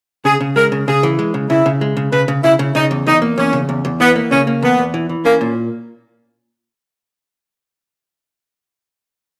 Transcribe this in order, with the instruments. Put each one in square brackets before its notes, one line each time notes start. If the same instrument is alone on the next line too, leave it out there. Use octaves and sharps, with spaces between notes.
[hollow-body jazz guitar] C#3 [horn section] G#4
[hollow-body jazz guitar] C#3
[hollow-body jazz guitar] G#3 [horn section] A#4
[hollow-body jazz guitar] C#3
[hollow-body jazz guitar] C#3 [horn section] G#4
[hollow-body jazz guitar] E3
G#3
C#3
[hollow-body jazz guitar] C#3 [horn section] E4
[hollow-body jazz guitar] C#3
G#3
C#3
[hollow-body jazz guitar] C#3 [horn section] B4
[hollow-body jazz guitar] C#3
[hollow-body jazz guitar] C#3 [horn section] E4
[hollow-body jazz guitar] C#3
[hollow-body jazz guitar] C#3 [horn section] D#4
[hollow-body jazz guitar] E2
[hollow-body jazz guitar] E2 [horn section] D#4
[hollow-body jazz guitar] A#3
[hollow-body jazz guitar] E2 [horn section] C#4
[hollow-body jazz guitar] C#3
E2
E2
[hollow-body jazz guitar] E3 [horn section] B3
[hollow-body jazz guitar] A#3
[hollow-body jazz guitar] C#3 [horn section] C#4
[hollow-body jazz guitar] A#3
[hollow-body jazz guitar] E2 [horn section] B3
[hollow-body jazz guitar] E2
E3
E3
[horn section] A#3 [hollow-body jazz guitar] C#4
[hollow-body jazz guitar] A#2